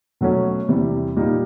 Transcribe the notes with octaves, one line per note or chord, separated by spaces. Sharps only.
B2 F#3 A3 C#4
E2 C3 E3 G3
A#2 G3 A#3 D#4